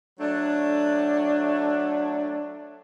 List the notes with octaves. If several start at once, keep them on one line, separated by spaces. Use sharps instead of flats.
F#3 A3 D4